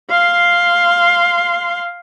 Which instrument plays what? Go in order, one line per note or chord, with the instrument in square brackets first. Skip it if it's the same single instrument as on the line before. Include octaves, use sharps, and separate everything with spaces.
[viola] F5 C6